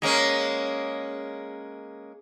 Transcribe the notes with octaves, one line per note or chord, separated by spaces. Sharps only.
G#3 A#3 C#4